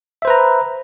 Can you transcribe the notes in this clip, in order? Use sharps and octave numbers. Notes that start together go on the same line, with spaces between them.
B4 C5 E5 A#5